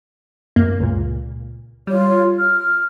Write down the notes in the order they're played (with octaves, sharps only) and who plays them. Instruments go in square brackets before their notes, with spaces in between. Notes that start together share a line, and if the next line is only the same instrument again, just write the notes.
[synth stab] F#2 A#3
C#2 A#2
[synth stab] G3 [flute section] F4 C#5
[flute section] F6